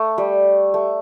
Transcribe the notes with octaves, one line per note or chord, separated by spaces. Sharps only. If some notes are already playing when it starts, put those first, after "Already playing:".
Already playing: A3
G3
A3